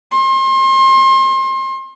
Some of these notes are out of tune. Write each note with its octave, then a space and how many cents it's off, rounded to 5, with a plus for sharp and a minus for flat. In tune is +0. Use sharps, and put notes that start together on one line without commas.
C6 +35